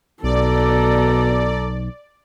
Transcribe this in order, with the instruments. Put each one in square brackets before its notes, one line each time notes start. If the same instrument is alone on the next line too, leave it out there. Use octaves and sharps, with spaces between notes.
[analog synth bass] B1 [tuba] B2 [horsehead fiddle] A4 A#5 [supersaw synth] D5